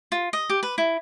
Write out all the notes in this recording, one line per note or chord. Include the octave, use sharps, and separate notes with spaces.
F4
D#5
G4
B4
E4